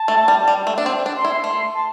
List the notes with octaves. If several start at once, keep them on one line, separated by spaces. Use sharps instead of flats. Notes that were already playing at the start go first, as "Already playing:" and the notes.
Already playing: A5
A3
G3
G3
A3
D4
C4
D4
C6
E4
A3 C6
A5